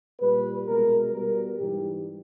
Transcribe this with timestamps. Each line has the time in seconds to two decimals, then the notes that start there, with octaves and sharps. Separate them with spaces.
0.20 A#2 G3 B4
0.67 B2 G#3 A#4
1.12 B2 G3 A#4
1.59 G#2 E3 G3 G4